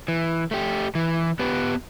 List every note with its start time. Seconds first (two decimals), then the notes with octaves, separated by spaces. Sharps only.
0.08 E3
0.51 A3 G4
0.95 E3
1.39 B3 G4 B4